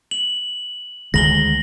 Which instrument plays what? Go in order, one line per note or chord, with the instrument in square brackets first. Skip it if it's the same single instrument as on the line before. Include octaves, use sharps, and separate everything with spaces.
[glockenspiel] F#7
[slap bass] D2 D#3 G#3 [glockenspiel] A#6 F#7 G7